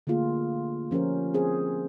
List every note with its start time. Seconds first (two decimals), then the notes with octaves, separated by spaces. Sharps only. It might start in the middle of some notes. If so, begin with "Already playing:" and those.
0.07 D3 A3 A#3 F4 G#4
0.91 F3 C#4 G4 A#4 C5
1.34 C4 G#4 C5